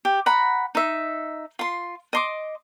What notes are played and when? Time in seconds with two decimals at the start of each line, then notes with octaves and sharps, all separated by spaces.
0.05 G4
0.26 F#5 A#5 B5
0.75 D#4 E5
1.59 F4 C6
2.13 D#5 C6 D6